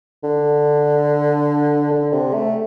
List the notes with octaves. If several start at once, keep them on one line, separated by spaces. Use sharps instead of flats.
D3
D3
C3
A3